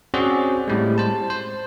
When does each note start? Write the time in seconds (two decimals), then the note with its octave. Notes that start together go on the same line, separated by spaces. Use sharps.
0.14 C4 C#4 F#4 G#4 C5 D5
0.68 A2 G3 G#3
0.98 C5 A5
1.30 C5